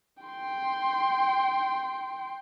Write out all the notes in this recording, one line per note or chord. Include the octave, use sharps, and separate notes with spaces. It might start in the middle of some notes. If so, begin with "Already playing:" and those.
G5 C6